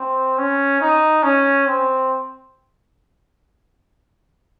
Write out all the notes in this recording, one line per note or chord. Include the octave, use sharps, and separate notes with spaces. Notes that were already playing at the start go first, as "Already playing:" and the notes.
Already playing: C4
C#4
D#4
C#4
C4